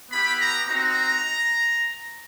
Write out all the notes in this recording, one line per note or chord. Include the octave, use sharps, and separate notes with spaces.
B3 E4 G4 B5
A#5
C4 D#4 F#4 A#5